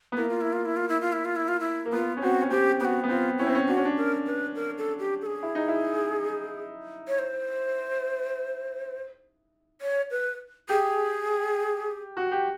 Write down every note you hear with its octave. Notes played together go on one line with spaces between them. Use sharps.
B3
A#3 E4
F4
E4
F4
E4
F4
E4
F4
E4
F4
E4
F4
E4
A#3
B3 F4
C#4
C4 F#4
C#4
C4 G4
B3 F#4 G4
B3
C4 F4
C#4 E4
C4
C#4
D4 F#4
C#4
D4
A#4
B4
A#4
A4
G4
A4
G#4
E4
D#4
E4
C#5
C5
C#5
B4
G4 G#4
F#4
G4